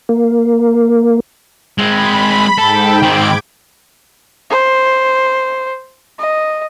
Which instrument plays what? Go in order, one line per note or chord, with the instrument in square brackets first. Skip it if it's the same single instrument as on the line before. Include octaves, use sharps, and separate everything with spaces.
[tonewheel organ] A#3
[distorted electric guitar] G#3 C4 [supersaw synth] B5
[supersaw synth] G#2 G5 [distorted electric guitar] A4
[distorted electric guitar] D#3 C4 [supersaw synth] D6 G#6 D7
[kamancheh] C5
D#5